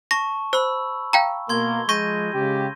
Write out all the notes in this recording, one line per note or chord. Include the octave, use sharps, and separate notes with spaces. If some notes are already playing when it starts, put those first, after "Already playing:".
A5 C#6 A#6
C5 B5 E6
F5 G5 A#5
B2 A#3 C6 G#6 G7
F3 G#3 C#6 G6 A#6 D#7
C#3 G#3 G4